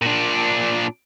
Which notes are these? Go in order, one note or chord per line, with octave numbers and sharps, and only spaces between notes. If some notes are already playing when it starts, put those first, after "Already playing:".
A#2 D4